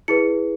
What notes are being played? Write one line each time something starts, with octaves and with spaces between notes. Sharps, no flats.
E4 G#4 B4 C#7